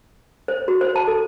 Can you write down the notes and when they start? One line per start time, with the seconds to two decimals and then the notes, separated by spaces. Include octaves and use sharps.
0.48 C5
0.68 F#4
0.81 C5
0.96 A5
1.07 A4